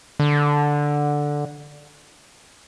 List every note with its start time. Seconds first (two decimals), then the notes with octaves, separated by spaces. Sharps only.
0.20 D3